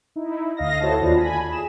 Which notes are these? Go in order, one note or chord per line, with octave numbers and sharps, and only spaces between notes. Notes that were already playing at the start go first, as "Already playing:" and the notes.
D#4 E4
D2 D#5 F5 A#6
E4 F#4 A4 C5 C#5 A5
D#2 D4 F4 A#6
G#5 B5
G#4 E7